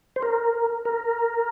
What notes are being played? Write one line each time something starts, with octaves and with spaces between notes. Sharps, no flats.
C5
A#4
A#4